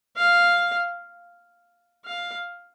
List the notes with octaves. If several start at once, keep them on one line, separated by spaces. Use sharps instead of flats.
F5
F5